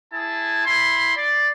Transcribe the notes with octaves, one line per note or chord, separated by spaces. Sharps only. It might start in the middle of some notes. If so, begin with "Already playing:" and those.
E4 G#4 G#5 A5
E4 B5 C6
D5